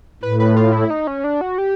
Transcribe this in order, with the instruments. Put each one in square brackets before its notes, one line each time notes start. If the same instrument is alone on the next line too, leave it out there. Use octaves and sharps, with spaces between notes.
[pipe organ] A2 [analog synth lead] B4
[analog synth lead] B4
F4
E4
D#4
C#4
D4
F#4
G4